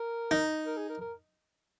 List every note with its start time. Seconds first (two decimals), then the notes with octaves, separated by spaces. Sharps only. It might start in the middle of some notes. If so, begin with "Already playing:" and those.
Already playing: A#4
0.31 D#4
0.66 A#4
0.77 G#4
0.89 A#4
1.01 A#4